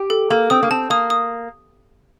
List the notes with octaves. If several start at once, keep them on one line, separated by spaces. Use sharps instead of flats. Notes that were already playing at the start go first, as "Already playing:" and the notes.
Already playing: G4
A4
A#3 A4
C4 D#6
A#3
C4 A5
A#3 D#6
D#6